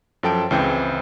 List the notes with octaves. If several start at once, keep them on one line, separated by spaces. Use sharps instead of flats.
F#2 F3 A4 G5 A5 D7
C#2 C#3 E3 C4 C5 G5